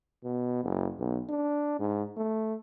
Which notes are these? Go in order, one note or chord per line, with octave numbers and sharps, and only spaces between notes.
B2
F#1
B1
D4
G#2
A3